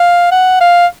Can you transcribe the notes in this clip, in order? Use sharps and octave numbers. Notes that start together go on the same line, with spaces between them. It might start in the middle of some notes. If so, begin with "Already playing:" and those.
Already playing: F5
F#5
F5